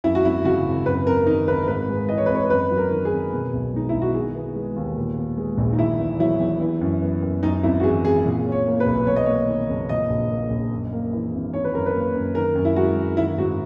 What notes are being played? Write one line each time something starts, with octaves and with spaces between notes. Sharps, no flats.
F#2 E4
F#4
G#1 E4
C#3 F#4
G#1
F#2 B4
G#1 A#4
D#3 D#4
G#1 B4
G#2 B4
G#3
E3 D#5
C#5
B4
G#1
C#5
F#2 B4
F#3
A#4
D#3
G#4
G#1
B2
B1
G#3 D#4
B1 E4
F#4
D#3 G#4
B3
G#3
D#2
A#2
B3
G#3
A#1
D#4
D#3 E4
E2
F#3 E4
E2
E3
F#2
B3
F#2
F#2 D#4
G#1 E4
F#4
E3 G#4
G#1 G#4
A#2
C#4
C#5
A#3
B4
B1
E2 C#5
D#5
A#3 C#5
D#3
F#1
A#2 D#5
A#1
A#3
A#1
F#2
A#3
E3
G#1
D#3 C#5
B4
F#2 A#4
B4
A#3
F#2
D#3 A#4
F#2
E4
G#3 F#4
F#2
D#3 E4
G#2 F#4